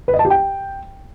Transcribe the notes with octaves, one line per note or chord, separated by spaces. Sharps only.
B4
D#5
A5
G4
G5